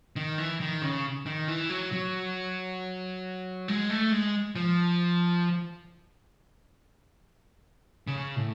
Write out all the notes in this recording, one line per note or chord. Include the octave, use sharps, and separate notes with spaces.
D#3
E3
D#3
C#3
D#3
E3
F#3
F#3
G#3
A3
G#3
F3
C#3
A2